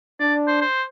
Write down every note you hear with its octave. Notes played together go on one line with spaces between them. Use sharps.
D4 D5
C5
C5